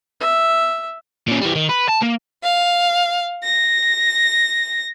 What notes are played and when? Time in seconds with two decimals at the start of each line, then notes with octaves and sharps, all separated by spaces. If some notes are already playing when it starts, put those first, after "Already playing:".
0.20 E5
1.28 A#2 C#4
1.42 E3 G3
1.56 D#3
1.69 B4
1.89 A5
2.02 A#3
2.43 F5
3.43 A#6